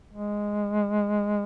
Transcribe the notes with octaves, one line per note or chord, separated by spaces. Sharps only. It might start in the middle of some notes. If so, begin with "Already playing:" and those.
G#3